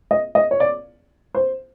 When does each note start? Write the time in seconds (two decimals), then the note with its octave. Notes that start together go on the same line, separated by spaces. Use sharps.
0.11 D#5
0.35 D#5
0.51 C#5
0.60 D5
1.35 C5